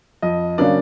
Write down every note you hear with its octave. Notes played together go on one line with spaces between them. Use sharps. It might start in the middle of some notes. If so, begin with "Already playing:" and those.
F2 D#5
C#3 F#3 A#3 D4 D5